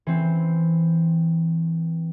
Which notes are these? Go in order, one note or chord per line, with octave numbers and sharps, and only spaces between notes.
E3 C4